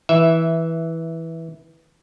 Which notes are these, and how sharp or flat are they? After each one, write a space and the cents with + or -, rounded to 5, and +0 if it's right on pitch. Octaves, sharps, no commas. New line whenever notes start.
E3 -10 E5 +0